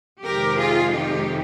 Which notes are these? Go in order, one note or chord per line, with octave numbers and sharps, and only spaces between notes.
F2 C3 D#3 G#3 G4 A#4
F4 G#4
D#4 G4